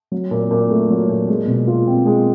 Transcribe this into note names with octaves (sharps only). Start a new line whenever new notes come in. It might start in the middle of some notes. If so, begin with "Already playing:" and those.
F#3
A#2
A#2
A3
F#3
A#2
G#3
B2
F4
C4
G#3